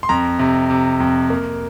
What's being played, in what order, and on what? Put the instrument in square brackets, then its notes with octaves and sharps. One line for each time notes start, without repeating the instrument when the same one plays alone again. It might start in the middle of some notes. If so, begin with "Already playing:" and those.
[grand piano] C6
F2 A#5
C3
C3
F2
A#3